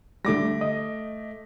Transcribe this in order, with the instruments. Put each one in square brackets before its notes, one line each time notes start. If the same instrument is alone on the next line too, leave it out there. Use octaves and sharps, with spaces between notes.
[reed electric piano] D3 G3 [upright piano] A3 D6 A#6
[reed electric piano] D#5